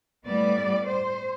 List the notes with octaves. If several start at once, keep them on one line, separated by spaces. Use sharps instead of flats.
A2 G3 B3 D5
C5